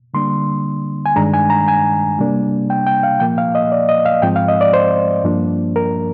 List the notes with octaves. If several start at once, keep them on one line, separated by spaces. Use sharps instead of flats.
D3 G3 A#3 D4 C6
G#5
G2 D#3 G#3 D4 A#5
G#5
A#5
G#5
C3 G3 A#3 D4
G5
G5
F5
A#2 F3 A#3 G5
F5
D#5
D5
D#5
F5
G#2 F3 G#3 C4 G5
F5
D#5
D5
C5
G2 F3 A#3 D4
A#4